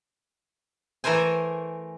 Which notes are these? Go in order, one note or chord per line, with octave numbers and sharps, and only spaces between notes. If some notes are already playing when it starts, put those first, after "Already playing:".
E3 A3 A#4 C5 G#5